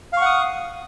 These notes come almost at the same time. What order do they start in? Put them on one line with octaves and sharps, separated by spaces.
F5 C#6 F#5 D#6